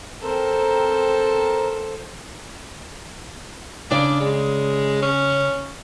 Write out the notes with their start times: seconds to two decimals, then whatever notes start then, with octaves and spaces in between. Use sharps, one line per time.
0.22 C4 A4 A#4 C5
3.91 C#3 D4 D5
4.20 G#3
5.03 C#4